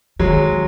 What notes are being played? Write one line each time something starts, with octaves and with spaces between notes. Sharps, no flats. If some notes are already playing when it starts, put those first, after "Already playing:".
D#3 F#3 G#3